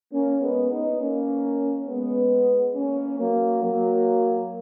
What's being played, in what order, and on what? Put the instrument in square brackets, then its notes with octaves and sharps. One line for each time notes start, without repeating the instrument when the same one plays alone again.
[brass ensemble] A#3 C#4
G#3 B3
B3 D#4
A#3 C#4
G#3 B3
A#3 C#4
F#3 A#3
F#3 A#3